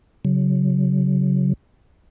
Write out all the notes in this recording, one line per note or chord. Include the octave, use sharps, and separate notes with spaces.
C#3 F#3